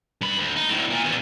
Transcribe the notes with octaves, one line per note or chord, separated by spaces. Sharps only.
G2 B5
D2
D#4
D2 A2
A#2
E2 A#2